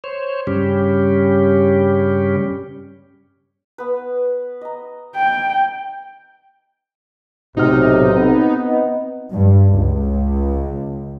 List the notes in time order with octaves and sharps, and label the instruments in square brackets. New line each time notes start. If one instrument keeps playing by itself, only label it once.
[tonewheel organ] C5 C#5
G2 C#3 G3 C#4 G4
[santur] B3 B4
D#5 A#5
[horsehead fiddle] G5
[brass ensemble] B1 [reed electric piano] A2 F#4 F6 [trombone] C3 [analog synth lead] D#4
[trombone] B3 [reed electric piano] C4
[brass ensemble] D#4
[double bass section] G2
C#2